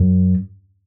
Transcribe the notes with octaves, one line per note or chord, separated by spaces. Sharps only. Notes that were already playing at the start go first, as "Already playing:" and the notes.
Already playing: F#2